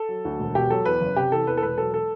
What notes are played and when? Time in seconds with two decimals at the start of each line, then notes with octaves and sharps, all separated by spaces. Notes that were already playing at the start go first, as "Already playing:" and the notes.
Already playing: A4
0.09 F#3
0.25 D2
0.40 E1
0.55 B2 G4
0.70 F#3 A4
0.85 E2 B4
1.01 F#1
1.16 C3 G4
1.32 E3 A4
1.47 E2 B4
1.57 A4
1.63 E1 B4
1.78 F#3 A4
1.94 A4